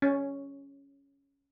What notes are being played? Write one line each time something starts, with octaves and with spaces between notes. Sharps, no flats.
C#4